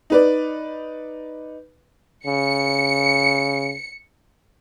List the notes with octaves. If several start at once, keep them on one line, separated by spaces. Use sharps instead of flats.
D#4 B4 D5
C#3 C#7